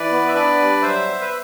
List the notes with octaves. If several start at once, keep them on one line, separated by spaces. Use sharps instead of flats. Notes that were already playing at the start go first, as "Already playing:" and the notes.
Already playing: E3 B4 D5
B3
E5
D4 B4 D5
G3
F#3 C5 E5
B3
B4